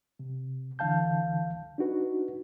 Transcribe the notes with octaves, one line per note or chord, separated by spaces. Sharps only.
C3
C#2 D3 E3 F5 A5 G6
D4 D#4 F#4 B4